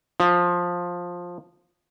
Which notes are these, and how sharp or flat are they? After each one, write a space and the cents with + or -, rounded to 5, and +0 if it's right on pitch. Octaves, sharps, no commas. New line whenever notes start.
F3 +10